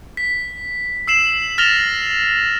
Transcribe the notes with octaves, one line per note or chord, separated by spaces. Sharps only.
B6
E6 C7 E7 F#7
F6 A6 A#6 E7 F7 G7